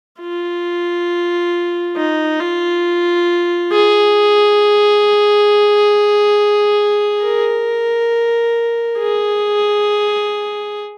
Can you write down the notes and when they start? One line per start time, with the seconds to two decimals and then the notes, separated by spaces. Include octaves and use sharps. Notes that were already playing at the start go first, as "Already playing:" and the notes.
0.21 F4
1.96 D#4
2.40 F4
3.72 G#4
7.23 A#4
8.99 G#4